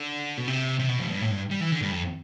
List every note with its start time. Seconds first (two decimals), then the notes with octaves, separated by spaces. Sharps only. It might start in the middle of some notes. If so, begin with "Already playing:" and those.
Already playing: D3
0.37 B2
0.47 C3
0.79 C3
0.89 B2
0.99 F2
1.09 G2
1.21 A2
1.30 G2
1.51 G3
1.60 E3
1.71 D3
1.81 G2
1.91 F2